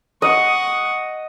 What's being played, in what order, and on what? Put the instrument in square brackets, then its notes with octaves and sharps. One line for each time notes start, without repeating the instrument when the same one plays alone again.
[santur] D#5 [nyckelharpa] F#5 C#6